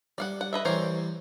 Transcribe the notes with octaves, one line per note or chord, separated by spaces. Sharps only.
G3 D5 F5 F#5
F#5
B4 D#5 E5
E3 G3 A#4 C5 C#5